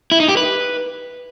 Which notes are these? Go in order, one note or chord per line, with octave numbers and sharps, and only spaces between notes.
E4
D#4
G4
B4